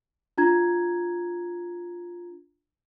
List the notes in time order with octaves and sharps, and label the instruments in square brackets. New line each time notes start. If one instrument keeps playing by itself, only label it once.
[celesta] D4 F4 A#5 G#6